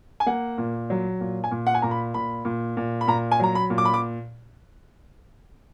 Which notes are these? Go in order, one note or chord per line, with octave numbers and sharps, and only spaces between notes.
G#5
A#3 F#5
A#2
F#3
A#2
G#5
A#2
F#5
G#5
A#2 A#5
B5
A#2 B5
A#2
A#2
B5
A#2 A#5
G#5
F#3 A#5
B5
A#2
D6
B5
D6